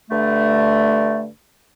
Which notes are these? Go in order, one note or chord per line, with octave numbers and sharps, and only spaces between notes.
G2 D3 A3